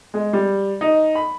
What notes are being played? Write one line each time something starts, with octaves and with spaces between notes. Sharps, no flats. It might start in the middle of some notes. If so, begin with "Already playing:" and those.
G#3
G3
D#4
B5